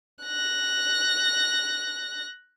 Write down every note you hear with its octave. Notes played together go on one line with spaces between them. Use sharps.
F#6 A#6